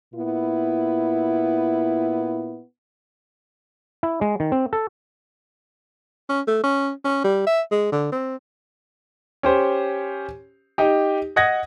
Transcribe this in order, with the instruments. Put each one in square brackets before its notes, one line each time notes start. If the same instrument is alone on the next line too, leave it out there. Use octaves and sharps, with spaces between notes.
[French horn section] A#2 B3 E4
[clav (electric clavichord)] E4
G#3
D#3
C4
A4
[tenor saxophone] C#4
A3
C#4
C#4
G3
E5
G#3
D3
C4
[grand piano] C#4 G4 C5
D#4 G4
D#5 F#5 D#6 G#6 A#6